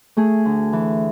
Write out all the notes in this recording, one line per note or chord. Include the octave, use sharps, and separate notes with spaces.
A3 G#4
D2
E3